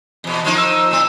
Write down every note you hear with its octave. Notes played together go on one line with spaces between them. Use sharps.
E2 B2
F3 A#3 D#4
E6
A2 C4